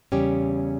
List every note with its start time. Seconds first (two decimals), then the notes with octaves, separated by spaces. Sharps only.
0.12 E2 C#3 G3 C#4 G4